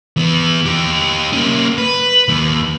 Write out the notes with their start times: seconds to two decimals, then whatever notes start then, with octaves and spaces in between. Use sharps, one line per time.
0.17 E3 B3
0.66 D#4 G4
1.33 A#3 C#4
1.78 B4
2.28 D#2 D#3